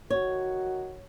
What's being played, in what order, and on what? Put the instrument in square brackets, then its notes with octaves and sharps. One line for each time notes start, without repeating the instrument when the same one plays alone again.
[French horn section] D#3 F#4 [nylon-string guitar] C#5